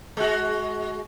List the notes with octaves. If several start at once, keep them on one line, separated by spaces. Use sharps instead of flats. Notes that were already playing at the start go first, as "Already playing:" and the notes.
G#3 F#4